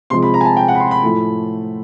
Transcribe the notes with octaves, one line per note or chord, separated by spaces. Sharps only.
C3 F3 G#3 C6
B5
A#5
G#5
A5
G5
F#5
B5
C6
B5
A2 F3 A3